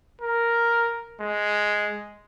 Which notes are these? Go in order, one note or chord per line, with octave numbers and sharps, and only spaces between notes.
A#4
G#3